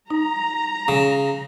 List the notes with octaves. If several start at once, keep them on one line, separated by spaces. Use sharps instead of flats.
D#4 A#5
C#3